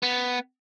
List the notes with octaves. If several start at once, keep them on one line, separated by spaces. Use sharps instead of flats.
B3